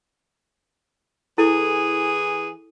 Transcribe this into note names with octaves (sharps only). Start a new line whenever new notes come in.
E3 E4 G#4 A4